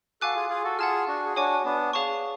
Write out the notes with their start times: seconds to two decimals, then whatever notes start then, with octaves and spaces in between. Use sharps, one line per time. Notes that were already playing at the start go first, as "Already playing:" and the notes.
0.21 F#4 A4 F5 G#5 D6 F#6
0.35 F4 G#4
0.50 F4 G#4
0.64 F#4 A4
0.78 F4 G#4 F#5 A5 F6
1.08 D4 F#4
1.26 G#4
1.36 D4 F#4 C#5 G#5 D6
1.65 B3 D4
1.93 G#4 C#5 F5 A5 C#6